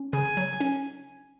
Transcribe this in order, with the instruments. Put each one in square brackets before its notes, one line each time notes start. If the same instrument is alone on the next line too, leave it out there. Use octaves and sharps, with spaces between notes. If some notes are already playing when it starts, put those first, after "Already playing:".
Already playing: [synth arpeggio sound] C#4
[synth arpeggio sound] C#3 [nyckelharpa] G#5
[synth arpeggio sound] F#3
C#4